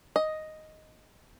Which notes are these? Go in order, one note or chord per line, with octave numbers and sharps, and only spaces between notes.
D#5